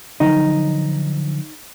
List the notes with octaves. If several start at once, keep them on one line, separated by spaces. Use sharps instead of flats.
D3 F3 F#3 D#4